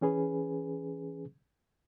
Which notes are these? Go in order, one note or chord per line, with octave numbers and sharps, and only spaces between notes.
E3 C#4 G#4 B4